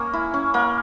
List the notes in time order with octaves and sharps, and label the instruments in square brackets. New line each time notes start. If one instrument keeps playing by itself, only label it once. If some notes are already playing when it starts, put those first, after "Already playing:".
Already playing: [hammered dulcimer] A#3 C#4
E4
C#4
A#3